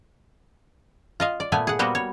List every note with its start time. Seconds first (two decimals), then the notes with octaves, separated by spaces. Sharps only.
1.20 F4 D#5 F5
1.40 D5
1.52 A#2 A3 B3 G#5
1.67 G#4 F#5
1.79 G3 A#3 B3 F#4 A#4 C5
1.95 C#5